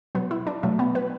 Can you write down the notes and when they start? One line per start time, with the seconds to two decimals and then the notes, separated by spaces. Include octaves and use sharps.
0.15 B2 F#3 B3
0.31 E4
0.47 D4
0.63 B2 F#3 A3
0.79 B3
0.95 B4